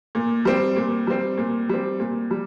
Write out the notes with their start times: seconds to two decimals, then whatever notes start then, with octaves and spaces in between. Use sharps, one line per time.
0.15 A#2
0.45 G3 C4
0.77 A#2
1.07 G3 C4
1.38 A#2
1.69 G3 C4
2.00 A#2
2.31 G3